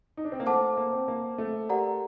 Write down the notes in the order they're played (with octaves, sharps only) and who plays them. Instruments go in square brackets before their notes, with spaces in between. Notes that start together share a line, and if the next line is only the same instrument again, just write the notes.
[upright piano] D#4
D4
C4
A#3
[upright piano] A3 [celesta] C5 F#5 A5 D6
[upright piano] A#3
C4
A#3
A3
[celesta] G4 A#4 D5 F#5 A#5